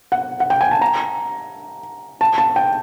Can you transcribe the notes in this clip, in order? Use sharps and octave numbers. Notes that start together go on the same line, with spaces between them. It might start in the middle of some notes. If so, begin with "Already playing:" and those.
F#5
F#5
G5
G#5
A5
A#5
A5
A5
G5